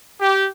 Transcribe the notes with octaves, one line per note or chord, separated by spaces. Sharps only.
G4